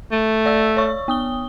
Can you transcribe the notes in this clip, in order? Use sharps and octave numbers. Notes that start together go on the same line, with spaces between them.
A3
D5 E6
C#5 C#6
B3 D#6 G7